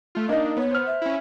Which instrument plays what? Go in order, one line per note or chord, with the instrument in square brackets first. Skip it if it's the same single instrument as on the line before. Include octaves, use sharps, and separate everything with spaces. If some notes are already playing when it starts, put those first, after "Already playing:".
[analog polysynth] A3 F4
[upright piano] A#3 D#4 [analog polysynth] D4 [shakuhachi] D#5
[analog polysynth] B3 [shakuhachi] C#5
[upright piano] C5 F6
[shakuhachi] E5
[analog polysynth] C#4 E4